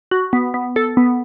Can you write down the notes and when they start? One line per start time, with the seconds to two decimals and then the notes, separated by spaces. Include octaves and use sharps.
0.11 F#4
0.33 B3
0.54 B3
0.76 A4
0.97 B3